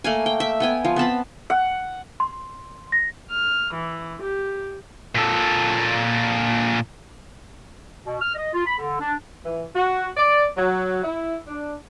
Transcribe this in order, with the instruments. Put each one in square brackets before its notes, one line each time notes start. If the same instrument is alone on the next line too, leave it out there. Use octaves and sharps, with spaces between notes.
[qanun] A3 A#3 G#5
G5
E5
B3 G5 G#5
F3
B3 C4 A5 B5
[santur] F#5
[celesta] C6
A#6
[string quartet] F6
E3
G4
[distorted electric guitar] A#2 A4
[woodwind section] B2
F6
D#5
F4
B5
D3
D4
[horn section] E3
F#4
D5
F#3
E4
D4